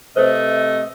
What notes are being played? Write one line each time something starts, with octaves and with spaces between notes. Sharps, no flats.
C3 A3 B4 C5 D#5